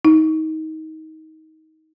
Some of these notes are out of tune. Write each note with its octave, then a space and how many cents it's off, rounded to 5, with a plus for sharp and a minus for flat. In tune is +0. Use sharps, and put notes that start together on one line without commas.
D#4 +25